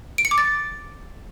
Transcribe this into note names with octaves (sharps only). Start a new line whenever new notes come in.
D7
C#7
D6
A6